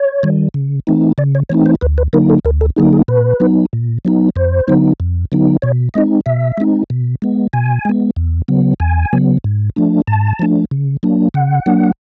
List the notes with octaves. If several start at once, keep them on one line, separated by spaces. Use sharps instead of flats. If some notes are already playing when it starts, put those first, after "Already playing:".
Already playing: C#5
D#3 G3
C#3
E3 A3 C4 D#4
C#3 D5
C#5
E3 A3 C4 D#4 C#5
C5
D2 B4
B4
D3 F#3 A#3 D#4 A#4
A4
D2 A#4
A4
D3 F#3 A#3 D#4 G#4
G#4
A#2 B4
F#3 B3 D#4
A#2
F#3 B3 D#4
F2 C5
D3 F#3 B3 D#4
F2
D3 F#3 B3 D#4
B2 C#5
G#3 C4 D#4 D#5
B2 E5
G#3 C4 D#4
B2
G#3 B3
B2 G#5
G#3 B3
E2
C#3 F#3 B3
E2 G#5
C#3 F#3 B3
G#2
F3 A3 D4
G#2 A5
F3 A3 D4
C#3
F#3 A#3 D4
C#3 F#5
F#3 A#3 D4